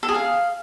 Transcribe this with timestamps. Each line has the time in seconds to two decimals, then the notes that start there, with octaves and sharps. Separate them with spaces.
0.03 A4
0.09 G#4
0.14 F5